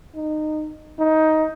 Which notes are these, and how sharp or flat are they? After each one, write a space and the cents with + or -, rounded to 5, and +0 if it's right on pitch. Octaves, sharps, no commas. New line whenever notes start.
D#4 -20
D#4 +15